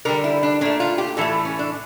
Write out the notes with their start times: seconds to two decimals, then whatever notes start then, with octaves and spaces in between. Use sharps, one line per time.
0.05 D3 G3 A#4
0.24 E4
0.43 D4
0.61 A#2 A3 D4
0.80 F4
0.98 G4
1.17 A2 E3 A3 A4
1.45 C#4
1.59 D4